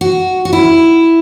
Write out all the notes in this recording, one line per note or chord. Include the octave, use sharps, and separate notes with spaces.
F#4
F#4
E4